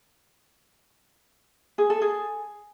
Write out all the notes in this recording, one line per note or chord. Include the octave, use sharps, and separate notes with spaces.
G#4
A4
G#4